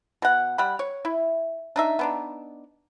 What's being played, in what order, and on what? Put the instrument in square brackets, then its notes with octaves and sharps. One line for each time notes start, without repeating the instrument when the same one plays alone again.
[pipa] B2 F#5
G3 F#5 B5
C#5
E4
D4 D#4 E5
B3 D4 D#4